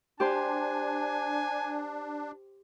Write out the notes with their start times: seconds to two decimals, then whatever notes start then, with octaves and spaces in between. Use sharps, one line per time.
0.20 D4 G4 C5 G#5 C6